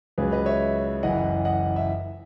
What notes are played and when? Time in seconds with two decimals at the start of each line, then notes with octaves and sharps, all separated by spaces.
0.18 C#2 C#3 F#3 G#4 B4
0.32 B4 D#5
0.46 C#5 E5
1.03 F#1 F#2 E3 D#5 F#5
1.45 D#5 F#5
1.76 E5